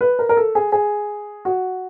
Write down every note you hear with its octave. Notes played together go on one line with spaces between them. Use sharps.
B4
A#4
A#4
A4
G#4
G#4
F#4